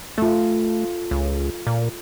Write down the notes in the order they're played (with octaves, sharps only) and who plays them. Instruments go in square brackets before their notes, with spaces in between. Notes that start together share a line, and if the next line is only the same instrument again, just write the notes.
[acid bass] A3 [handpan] F4 A4
[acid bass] C#2
A#2